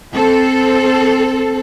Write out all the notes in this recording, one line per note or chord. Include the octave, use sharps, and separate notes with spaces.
C4 A4